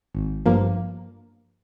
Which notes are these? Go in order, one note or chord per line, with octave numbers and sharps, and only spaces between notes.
G#1
G2 F3 A#3